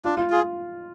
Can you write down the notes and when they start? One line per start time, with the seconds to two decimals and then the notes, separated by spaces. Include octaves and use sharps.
0.05 D4 F4
0.17 F4
0.30 F4 G#4